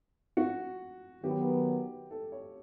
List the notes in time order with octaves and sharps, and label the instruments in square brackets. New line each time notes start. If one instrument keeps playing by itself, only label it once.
[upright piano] F#4
[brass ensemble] D#3 F#3 B3 [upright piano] G4
[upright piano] A4
C#5